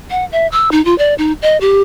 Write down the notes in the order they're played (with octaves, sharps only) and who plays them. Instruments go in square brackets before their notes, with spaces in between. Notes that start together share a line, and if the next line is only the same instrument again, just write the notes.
[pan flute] F#5
E5
E6
D#4
F4
D5
D#4
D#5
G4